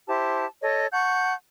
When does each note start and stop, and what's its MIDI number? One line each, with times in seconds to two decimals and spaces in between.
0.07 0.44 64
0.07 0.44 67
0.07 0.44 72
0.07 0.44 81
0.62 0.86 69
0.62 0.86 73
0.62 0.86 75
0.92 1.33 78
0.92 1.33 81
0.92 1.33 85
0.92 1.33 91